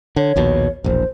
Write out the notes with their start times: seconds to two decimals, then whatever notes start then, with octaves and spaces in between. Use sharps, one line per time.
0.16 D3 C#5
0.36 A#1 D#2 B2
0.84 E1 A#1 C5